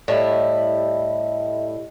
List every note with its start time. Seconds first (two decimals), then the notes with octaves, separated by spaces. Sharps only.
0.08 A2 G3 E4 D#5 E5